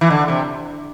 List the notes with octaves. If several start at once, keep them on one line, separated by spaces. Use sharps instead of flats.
E3
D3
C3